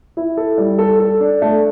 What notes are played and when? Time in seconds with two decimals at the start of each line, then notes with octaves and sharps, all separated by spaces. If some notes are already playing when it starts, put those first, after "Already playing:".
0.17 E4
0.37 A4
0.58 G3
0.79 A4
1.00 A4
1.20 D4
1.42 A3